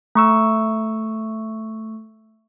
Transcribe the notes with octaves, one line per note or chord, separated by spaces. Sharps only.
A3 C#6 E6